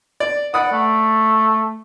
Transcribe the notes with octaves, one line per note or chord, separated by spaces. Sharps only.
D5
D5 F#5 B5 D#6
A3